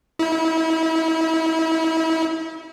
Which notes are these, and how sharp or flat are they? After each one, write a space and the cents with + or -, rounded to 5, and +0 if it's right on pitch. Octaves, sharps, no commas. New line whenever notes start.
E4 -35